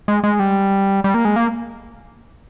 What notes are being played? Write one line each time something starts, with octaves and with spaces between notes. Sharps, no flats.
G#3
G#3
G3
G3
A#3
G#3
A#3